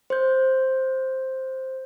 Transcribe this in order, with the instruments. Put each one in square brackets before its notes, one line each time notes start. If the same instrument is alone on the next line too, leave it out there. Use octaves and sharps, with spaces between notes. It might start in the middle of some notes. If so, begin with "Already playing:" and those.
[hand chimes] C5 G6